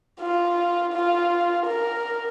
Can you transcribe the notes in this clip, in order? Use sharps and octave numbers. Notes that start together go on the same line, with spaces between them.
F4
F4
A#4